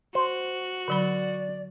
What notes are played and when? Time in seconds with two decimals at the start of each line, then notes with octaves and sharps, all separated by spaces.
0.15 F#4 C5
0.88 D3 F#3 D5 B5